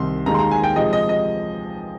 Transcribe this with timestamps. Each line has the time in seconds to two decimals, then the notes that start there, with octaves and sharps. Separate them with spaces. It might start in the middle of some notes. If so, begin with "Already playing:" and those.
Already playing: C2 C3 D#3 C6
0.26 D#2 D#3 G#3 D#4 A#5
0.34 C6
0.39 A#5
0.51 G#5
0.64 G5
0.76 C3 F3 G#3 D#5
0.93 D#5
1.09 D#5